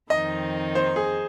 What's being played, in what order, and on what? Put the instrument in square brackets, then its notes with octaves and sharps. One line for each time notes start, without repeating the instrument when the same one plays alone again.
[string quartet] F2 D#3 C4 D#4 [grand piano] D#5
[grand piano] C5
G#4